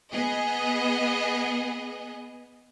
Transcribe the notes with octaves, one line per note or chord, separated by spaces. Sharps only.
B3 G#4 D#5